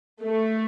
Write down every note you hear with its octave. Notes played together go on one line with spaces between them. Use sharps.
A3